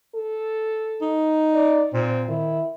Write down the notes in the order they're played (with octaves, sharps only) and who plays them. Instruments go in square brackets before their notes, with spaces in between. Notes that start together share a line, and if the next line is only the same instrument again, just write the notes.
[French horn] A4
[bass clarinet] D#4
[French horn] D5
[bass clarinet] A#2 [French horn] C4
[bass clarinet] D#3 [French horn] E4